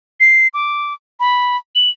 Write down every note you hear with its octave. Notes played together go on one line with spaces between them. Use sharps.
C7
D6
B5
F#7